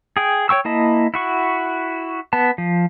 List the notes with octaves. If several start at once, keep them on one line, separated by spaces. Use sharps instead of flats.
G#4 G5
C#5 G5 C#6 E6
A#3 E4 D#5 A5
E4 F#4 C#6
B3 A5
F3